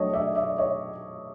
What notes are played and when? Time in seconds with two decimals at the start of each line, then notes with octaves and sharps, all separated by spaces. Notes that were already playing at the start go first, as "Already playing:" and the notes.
Already playing: F#3 A3 D4 C#5 D#5
0.13 D5 E5
0.35 D5 E5
0.58 C#5 D#5